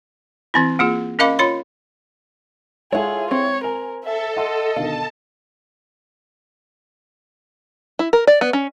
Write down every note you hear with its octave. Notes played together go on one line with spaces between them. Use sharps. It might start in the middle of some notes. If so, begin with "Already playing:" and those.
E3 C4 E4
A#3 F4 G#4
C#4 A#4 D#5 F5 B5 D6
F4 C#5 B5 C6
G#3 E4 F4 G#4 A4 C#5 F#5
C4 C#5
A#4 G#5 F7
A4 E5
D#5 E5 F#5 C6
B2 D3 D#3 F5 A5
E4
A#4
D5
B3
C#4